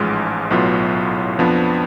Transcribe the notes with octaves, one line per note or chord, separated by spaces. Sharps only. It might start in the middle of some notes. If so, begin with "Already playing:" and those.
Already playing: A1 G#2 F3 G#3
B1 A2 F#3 B3 F4
F2 F3 B3 D4